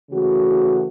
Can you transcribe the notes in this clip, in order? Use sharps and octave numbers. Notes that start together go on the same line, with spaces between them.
C#3 E3 A3 F#4